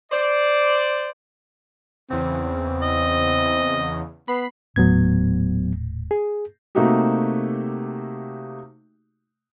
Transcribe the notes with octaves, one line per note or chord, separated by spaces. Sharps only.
C5 D5
E2 C#3 C4
D#5
B3 B5 C7
D#1 A2 F#3 B3 G#6
G#4
C3 A3 A#3 D#4 F#4 G4